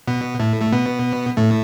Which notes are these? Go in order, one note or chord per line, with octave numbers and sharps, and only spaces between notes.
B2 B3
A2 A3
A3
B2 B3
A2 A3